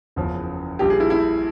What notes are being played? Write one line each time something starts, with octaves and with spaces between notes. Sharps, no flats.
F#1 E2 C#3 F3
A#1 A#2 G3 G4
G#4
E4
E4